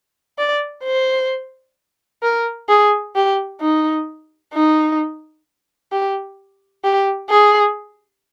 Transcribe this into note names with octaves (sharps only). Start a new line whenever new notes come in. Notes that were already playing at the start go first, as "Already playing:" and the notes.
D5
C5
A#4
G#4
G4
D#4
D#4
G4
G4
G#4